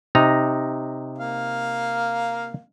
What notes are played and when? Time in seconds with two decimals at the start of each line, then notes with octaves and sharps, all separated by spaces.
0.15 C3 D#4 A#5
1.18 A#3 F5